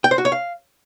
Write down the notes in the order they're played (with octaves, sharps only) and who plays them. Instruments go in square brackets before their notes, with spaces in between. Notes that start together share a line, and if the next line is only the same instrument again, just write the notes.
[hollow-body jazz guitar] G5
C5
F#4
C#5
F5